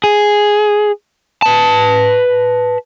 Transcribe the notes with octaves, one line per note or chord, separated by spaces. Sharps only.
G#4
B4 A5